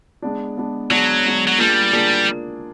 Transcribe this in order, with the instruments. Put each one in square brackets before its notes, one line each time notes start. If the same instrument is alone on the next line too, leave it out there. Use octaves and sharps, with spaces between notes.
[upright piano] G#3 B3 D4
G#3 B3 D4
[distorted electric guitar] F#3 [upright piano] G#3 B3 D4
[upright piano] G#3 B3 D4
[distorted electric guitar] F#3
[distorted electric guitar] G3 [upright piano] A#3 D4 F4 G#4
[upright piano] A#3 D4 F4 G#4